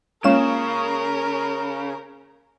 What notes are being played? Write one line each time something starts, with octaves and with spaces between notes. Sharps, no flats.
C#3 G#3 A#3 C#4 F4 A#4 E7